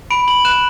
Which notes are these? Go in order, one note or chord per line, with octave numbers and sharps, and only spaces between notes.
B5 D7
B5 F#7
F#6 E7